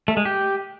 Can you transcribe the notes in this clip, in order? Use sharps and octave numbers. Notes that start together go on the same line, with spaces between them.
A3
G#3
G4